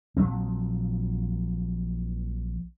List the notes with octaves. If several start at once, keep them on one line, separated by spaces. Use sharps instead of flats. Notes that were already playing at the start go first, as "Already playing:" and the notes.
A#1 F3 F#3 C4